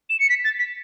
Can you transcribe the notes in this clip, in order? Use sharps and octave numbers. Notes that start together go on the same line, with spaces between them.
E7
C#7
B6
A6
B6